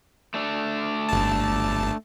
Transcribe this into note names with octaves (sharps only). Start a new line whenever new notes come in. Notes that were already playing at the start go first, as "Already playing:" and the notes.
A3 D4
G1 A5